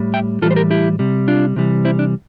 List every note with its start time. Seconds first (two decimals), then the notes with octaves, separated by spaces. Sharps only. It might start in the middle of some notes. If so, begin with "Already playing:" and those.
Already playing: A2 G3
0.14 E5 G5
0.42 A2 E3 G3 F4 A4
0.51 C5
0.56 G4 A#4
0.71 E4 G4
0.99 C3 G3
1.28 D4 F4
1.56 C3 E3 G3
1.85 C4 E4
1.99 D4